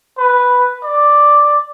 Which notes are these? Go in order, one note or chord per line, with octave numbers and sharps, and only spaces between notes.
B4
D5